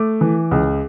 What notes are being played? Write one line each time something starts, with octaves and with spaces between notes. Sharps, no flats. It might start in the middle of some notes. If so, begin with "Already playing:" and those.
Already playing: A3 D6
E3
C#2